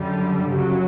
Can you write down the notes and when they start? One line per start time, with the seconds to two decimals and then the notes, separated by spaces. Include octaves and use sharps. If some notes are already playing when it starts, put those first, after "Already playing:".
Already playing: F#2 D3 G3
0.51 F#2 C#3 F#3